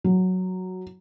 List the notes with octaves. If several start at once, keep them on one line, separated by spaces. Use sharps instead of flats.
F#3